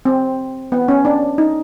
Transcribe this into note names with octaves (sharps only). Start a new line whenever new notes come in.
C4
B3
C#4
D4
D#4